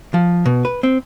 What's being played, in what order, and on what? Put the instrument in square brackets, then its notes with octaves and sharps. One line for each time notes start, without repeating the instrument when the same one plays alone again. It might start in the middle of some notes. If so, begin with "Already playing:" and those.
[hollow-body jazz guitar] F3
B2
B4
C4